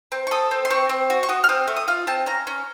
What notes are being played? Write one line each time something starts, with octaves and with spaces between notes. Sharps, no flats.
C4
C#6
A4 D#6
C4
C6
C4 C#6
C4
F#4
C#6
F#4 D#6
F6
C4 D#6
A3
D#6
F4 F6
C4 A5
C#4 A#5
C#4